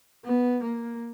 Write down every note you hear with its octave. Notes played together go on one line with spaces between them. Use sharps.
B3
A#3